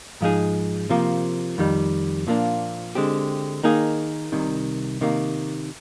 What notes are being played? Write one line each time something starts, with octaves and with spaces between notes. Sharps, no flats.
G#2 F3 G#3 D#4 G#4
C3 F3 A#3
F2 D#3 G3
A#2 F3 A#3 D4
D3 G#3 C4 G4
D#3 A#3 D#4 G#4
C2 C3 D#3
C3 D#3 A#3